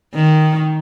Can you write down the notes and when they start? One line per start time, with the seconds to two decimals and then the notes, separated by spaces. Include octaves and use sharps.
0.15 D#3